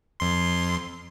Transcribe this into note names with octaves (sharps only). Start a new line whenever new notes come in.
F2 C6